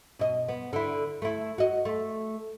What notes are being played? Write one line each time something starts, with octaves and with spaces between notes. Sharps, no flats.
B2 D#5
B3
D3 E4
A3 E4
F#4 D#5
A3